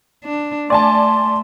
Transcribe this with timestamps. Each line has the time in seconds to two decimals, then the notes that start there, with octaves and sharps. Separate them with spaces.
0.24 D4
0.70 A3 D5 G#5 A5 C6